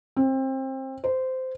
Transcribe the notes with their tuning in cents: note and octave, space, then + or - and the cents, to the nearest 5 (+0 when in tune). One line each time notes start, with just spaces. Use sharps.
C4 +25
C5 -15